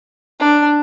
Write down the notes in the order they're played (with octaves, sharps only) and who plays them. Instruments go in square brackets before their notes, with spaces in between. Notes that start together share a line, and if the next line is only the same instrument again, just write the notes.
[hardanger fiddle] D4